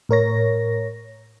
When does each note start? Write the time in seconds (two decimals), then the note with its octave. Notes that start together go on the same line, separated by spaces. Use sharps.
0.09 A2 A#4 C#5 A#6